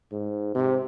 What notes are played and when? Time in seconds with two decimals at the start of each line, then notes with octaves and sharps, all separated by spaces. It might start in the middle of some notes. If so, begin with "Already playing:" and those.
0.12 G#2
0.55 C3